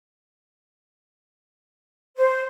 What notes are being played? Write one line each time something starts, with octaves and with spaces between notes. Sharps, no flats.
C5